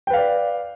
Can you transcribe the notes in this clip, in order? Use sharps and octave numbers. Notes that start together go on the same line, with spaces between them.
B4 D5 F5 G5